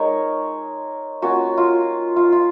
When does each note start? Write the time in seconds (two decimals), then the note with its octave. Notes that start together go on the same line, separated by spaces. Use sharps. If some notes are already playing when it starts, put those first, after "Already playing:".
Already playing: G#3 D#4 A#4 C#5
1.22 A#3 C#4 F4 F#4
1.58 F4
2.16 F4
2.32 F4